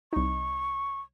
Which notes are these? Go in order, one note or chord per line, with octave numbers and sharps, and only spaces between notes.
C2 D#4 C#6